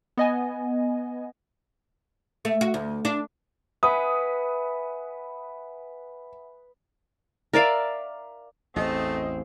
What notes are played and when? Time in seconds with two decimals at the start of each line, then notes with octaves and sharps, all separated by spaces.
0.17 B3 D#5 G#5
2.45 A3
2.61 F#4
2.74 D2
3.05 D4
3.83 B4 E5 F#5 G#5 D#6
7.53 A#4 D5 E5 F5
8.76 A1 E2 A3 C4 D#5